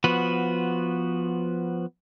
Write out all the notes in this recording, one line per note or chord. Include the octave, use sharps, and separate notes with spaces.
F3 B3 F#4 B4